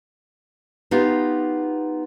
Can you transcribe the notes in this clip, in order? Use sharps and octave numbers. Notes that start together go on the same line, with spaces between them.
B3 D#4 F4 G4